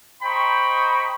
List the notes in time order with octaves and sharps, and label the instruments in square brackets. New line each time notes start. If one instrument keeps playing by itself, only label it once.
[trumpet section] C5 D#5 G5 A#5 B5 C#6